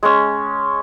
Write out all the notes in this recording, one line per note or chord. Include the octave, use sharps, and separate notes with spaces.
G#3 C#4